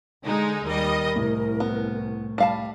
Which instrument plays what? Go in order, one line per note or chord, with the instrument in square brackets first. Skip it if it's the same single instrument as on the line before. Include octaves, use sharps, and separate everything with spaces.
[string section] D3 G#3 D#4
[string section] D#2 G3 D#5 [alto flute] A#4
[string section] C2 [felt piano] A2
[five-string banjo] B3
G3 F5 A5